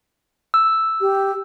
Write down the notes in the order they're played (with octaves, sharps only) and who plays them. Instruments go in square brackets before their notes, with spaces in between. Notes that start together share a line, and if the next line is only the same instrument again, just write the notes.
[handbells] E6
[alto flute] G4